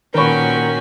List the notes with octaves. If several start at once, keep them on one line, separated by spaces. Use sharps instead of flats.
A#2 D#3 C#4 F#4 A#4 B4 C#5 G5